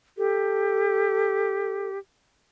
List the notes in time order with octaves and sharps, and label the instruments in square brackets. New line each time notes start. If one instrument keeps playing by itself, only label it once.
[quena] G4 [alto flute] A4